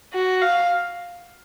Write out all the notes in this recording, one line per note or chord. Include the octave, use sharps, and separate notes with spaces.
F#4
F5